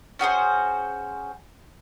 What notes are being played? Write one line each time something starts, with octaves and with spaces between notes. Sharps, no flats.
C#4 F#4 G#4 C5